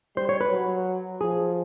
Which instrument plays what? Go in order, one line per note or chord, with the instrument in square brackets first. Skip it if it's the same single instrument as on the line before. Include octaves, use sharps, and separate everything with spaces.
[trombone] G3 [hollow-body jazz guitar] C5
[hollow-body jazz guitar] C#5
B4
[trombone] F#3
[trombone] F3 [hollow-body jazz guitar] G#4